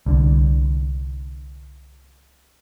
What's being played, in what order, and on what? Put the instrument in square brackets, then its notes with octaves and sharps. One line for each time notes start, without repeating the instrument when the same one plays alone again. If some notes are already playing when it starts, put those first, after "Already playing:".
[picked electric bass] C2 D3